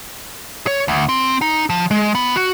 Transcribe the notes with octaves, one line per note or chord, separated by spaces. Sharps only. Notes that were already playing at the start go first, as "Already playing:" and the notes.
C#5
D2
C4
D#4
F3
G#3
B3
F#4